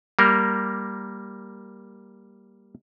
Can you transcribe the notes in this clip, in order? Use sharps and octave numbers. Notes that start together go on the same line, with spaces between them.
G3 A#3 A#4